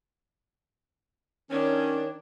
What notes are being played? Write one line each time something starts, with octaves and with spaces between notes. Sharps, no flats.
D#3 C#4 D4 C#5